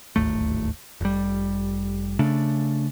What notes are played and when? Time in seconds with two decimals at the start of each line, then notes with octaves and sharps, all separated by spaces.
0.16 D1 G#1 D#2 A3
1.01 F1 G3
2.19 C#3 A3 D4